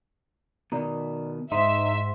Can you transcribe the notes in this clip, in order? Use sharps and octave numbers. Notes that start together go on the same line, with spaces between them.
B2 D#3 D5 A#5
G#2 D#4 E5 C6